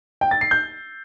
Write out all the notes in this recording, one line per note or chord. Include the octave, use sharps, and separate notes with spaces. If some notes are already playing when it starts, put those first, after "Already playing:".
G5
A6
C7
G6